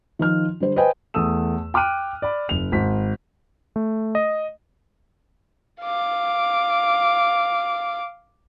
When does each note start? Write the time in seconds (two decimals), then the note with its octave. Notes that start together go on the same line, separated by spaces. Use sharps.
0.19 D#3 F3 F6
0.60 D3 G3 C5
0.76 B4 C5 D#5 G5 G#5
1.14 E2 A3 D#6 E6 E7
1.74 G5 D6 F6 F#6 D#7
2.22 D5 B5
2.49 F#1 F7
2.72 G#1 B6
3.76 A3
4.15 D#5
5.81 F5 D6